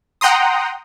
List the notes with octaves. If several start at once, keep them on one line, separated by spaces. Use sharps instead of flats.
F#5 G5 A#5 C6 D#6